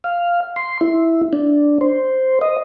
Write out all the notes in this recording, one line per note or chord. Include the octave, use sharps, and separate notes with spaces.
F5
C6
E4
D4
C5
D#5